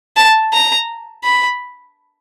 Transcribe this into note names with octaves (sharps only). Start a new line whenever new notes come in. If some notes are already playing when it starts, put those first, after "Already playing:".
A5
A#5
B5